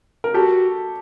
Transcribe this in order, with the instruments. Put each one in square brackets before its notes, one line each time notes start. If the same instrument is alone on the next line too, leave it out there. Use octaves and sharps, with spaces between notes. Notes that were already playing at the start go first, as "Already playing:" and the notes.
[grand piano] A#4
[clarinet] F#4 [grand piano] G4 A4